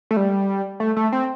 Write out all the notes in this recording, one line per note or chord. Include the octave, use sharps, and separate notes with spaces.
A3
G3
A3
A3
C4